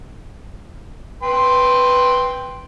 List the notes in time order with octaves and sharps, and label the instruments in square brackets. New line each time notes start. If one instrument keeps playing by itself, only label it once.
[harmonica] B4 G5 C6